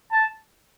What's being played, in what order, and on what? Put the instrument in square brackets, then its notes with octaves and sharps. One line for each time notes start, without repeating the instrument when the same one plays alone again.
[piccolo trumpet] A5